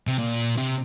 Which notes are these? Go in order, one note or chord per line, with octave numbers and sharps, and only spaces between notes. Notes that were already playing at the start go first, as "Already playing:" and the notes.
C3
A#2
C3